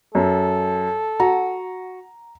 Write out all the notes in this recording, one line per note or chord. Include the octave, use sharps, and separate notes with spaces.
F#2 A4
F#4 A#5